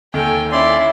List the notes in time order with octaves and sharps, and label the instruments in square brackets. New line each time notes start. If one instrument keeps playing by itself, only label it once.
[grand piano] D#2 D#3 [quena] A4 [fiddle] G5 G#5
[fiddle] C#4 E4 [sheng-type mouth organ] D5 C6 [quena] E5